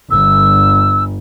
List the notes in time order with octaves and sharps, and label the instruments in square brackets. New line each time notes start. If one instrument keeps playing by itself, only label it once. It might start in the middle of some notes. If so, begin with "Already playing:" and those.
[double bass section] G1 [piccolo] E6